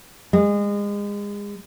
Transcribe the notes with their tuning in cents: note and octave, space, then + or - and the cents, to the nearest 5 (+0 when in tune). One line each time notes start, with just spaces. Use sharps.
G#3 -30